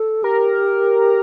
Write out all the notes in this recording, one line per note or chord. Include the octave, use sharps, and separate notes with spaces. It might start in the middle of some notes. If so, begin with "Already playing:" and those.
Already playing: A4
G4 A#4